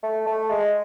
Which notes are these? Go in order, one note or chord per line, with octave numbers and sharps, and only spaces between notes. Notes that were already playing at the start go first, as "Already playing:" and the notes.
A3
A3
G#3